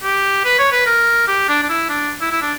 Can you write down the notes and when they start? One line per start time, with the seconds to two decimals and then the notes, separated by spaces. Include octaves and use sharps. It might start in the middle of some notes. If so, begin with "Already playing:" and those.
0.03 G4
0.45 B4
0.59 C#5
0.72 B4
0.86 A#4
1.28 G4
1.48 D4
1.63 D4
1.69 E4
1.89 D4
2.21 E4
2.31 E4
2.42 D4